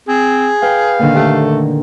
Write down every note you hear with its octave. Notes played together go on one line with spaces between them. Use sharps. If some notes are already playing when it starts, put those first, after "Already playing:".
C4 G#4
B4 F5 G5
A#2 D3 D#3
A3 G4